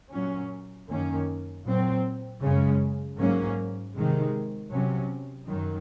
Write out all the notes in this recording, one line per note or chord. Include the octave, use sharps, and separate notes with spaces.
A#2 F#3 C#4
F#2 D#3 A#3 C#4
A#2 F#3 C4
F#2 C#3 G#3 C#4
G#2 F#3 A#3 C#4
C3 D#3 G#3
C3 F#3 C#4
F#2 D#3 F#3